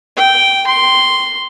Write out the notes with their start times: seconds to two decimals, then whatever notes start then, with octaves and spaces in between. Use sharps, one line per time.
0.17 G5
0.67 C6